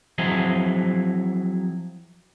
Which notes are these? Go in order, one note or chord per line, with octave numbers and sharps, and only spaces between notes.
F3 F#3 C4 E4 G#4 D#5